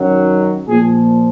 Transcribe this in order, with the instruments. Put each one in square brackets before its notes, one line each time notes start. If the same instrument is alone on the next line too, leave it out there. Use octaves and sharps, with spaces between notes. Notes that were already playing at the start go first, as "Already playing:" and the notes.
Already playing: [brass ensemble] F#2 D#3 F#3
A#2 F3 G#4